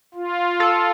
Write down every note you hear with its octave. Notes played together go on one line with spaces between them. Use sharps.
F4
A4